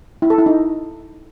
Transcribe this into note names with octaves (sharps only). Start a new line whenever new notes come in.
E4
A4
E4
D#4